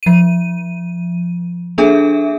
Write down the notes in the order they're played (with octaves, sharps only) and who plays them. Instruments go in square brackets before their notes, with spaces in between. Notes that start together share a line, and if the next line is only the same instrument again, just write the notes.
[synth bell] F3 D#7
A#3 D4 G#4 A4 E5